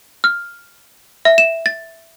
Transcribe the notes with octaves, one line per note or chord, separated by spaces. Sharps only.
F6
E5
E7
A6